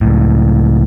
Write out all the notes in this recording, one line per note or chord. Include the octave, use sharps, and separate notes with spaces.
C#2 A2